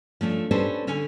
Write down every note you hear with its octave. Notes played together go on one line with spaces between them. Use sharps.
F3 A3 C#4 D4
C#4 D4 G4 A4 B4 C5
D3 C#4 A4 G#5